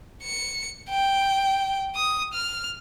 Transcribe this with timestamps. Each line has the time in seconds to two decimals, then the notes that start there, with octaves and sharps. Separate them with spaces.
0.23 C#7
0.90 G5
1.95 D#6
2.33 F6